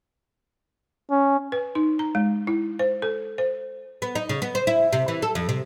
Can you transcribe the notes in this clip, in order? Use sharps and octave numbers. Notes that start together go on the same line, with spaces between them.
C#4
B4
D#4
A#5
G#3
E4
C5
A4
C5
B3
D#4
C#3
B3
C5
E4
C3
E3
A4
F2
C3